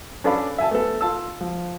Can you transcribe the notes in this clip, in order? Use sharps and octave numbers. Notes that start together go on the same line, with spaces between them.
C#4 D4 A4 D5 F5 B5
E5 G#5 A5
A3 B3 A4
F4 A5 E6
F3